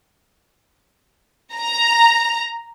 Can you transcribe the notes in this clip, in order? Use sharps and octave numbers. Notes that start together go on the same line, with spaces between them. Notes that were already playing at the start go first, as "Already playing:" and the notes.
A#5